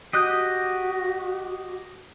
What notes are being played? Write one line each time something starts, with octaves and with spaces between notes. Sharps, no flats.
F#4 G4 D#5 D#6 F#6 G6